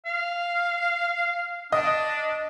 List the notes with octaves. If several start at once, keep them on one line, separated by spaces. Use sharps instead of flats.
F5
D4 D#5 D#6